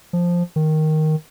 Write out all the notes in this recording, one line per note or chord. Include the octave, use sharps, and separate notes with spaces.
F3
D#3